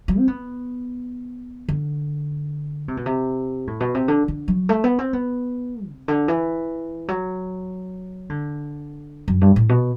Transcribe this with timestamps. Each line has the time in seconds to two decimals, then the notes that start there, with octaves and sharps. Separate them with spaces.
0.08 F#3
0.19 C4
0.28 B3
1.69 D3
2.88 C3
2.97 B2
3.06 C3
3.67 A2
3.80 B2
3.95 C3
4.08 D3
4.28 D3
4.48 F#3
4.69 A3
4.84 B3
4.99 C4
5.13 B3
5.89 C3
6.08 D3
6.28 E3
7.08 F#3
8.30 D3
9.28 F#2
9.41 G2
9.56 A2
9.69 B2